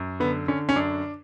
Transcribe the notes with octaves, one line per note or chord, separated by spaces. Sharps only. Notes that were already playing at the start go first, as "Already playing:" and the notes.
Already playing: F#2
D3 B3
D3 C#4
C#4
F#2 D4